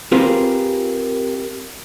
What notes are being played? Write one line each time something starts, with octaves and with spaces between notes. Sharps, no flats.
C4 F4 G4 G#4 A#4 B4